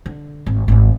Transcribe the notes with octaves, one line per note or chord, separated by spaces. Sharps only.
D3
G#1
G#1 E2